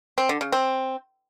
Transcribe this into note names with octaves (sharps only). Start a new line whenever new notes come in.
C4
D3
C#3
C4